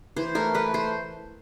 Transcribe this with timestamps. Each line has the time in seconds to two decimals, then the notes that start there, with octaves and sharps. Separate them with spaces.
0.16 E3 C5
0.35 A3 A#4
0.54 A3 B4
0.74 A3 C5